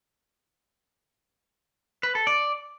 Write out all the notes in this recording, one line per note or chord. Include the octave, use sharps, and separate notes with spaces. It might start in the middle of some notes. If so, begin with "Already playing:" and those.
B4
A4
D5